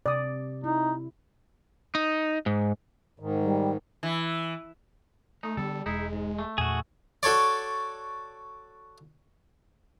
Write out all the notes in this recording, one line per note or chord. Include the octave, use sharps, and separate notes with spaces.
C3 D5 D#6
D#4 E4
D#4
G#2
G#2 D#3
G3
E3
A3 D#4
D3 G3 B3 D4 A4
E1 G#3 D#4 E4
G#2
A3
E2 A#2 F#4 G#4
F#4 A4 C#5 D5